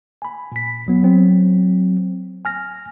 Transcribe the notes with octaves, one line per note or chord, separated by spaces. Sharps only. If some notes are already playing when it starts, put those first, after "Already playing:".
G#5 B5
A#2 B6
D2 F#3 B3
F#3 C4
G#5 F6 A#6